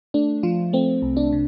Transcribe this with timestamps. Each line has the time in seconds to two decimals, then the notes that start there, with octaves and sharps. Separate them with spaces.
0.14 A3 D4
0.43 F3 F4
0.73 A3 C4
1.02 C2
1.17 D4
1.32 C3